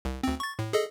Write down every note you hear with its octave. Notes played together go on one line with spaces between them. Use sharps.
C2
D2 C4
C#6 A6
A2
G#4 A4 D#5